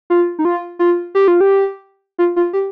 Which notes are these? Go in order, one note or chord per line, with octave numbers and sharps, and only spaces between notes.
F4
D#4
F4
F4
G4
F4
G4
F4
F4
G4